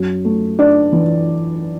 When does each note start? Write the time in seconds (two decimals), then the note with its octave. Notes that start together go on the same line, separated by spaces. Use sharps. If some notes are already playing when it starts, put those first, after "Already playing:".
Already playing: F#2
0.25 A3
0.59 D4 D5
0.92 E3